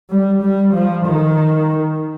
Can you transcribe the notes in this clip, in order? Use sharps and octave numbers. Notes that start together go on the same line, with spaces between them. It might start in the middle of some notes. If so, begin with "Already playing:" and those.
G3
G3
F3
D#3